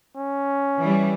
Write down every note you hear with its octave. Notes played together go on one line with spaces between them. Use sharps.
C#4
E3 G3